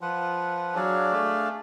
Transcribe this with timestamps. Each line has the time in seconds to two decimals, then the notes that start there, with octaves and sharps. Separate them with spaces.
0.01 F3 F4 B4 F#5
0.74 F#3 D4 G#4 D5 F5
1.12 A3